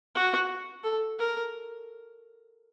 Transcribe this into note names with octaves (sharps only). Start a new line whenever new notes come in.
F#4
A4
A#4